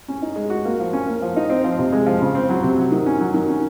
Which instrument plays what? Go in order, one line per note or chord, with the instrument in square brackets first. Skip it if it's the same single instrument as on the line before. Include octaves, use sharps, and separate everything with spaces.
[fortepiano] C#4
D#4
G#3
F#4
A#3
F3
C#4
A#3
F3
D#4
C4
F3
C3
G#3
F3
C#3
C4
F#3
C3
F#3
D#3
C#4
F#3
D#3
C#4